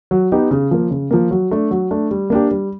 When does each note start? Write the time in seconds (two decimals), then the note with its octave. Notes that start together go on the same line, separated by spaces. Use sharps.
0.11 F#3
0.32 B3 D#4 G4
0.51 C#3
0.71 F3 A#3
0.91 C#3
1.11 F3 A#3
1.31 F#3
1.51 A3 D4
1.71 F#3
1.91 A3 D4
2.11 G3
2.30 A#3 D4 G4
2.51 G3